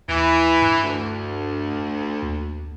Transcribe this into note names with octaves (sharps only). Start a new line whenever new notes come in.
D#2 E3
G2
D2
D#2